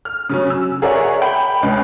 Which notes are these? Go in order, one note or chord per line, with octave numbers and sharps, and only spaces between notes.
F6
C#3 F#3 C#4
E6
G#4 A#4 C#5 D5 E5 F#5
G5 B5
C#2 C#3